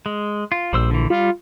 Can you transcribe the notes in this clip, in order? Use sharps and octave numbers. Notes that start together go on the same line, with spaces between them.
G#3
F4
A#1 G3 C5 E6
D3 E3
G3 F4